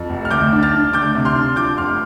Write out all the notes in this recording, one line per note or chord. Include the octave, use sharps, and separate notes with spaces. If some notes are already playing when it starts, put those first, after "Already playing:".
Already playing: F2
F1
F6
D2 D6 G6
D4
F6 A6
D4
D2 D6 G6
C3
C6 F6
D4
F3 D6 G6
F1 C6 F6